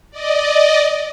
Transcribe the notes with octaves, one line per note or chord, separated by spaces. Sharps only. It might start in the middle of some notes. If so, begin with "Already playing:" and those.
D5 D#5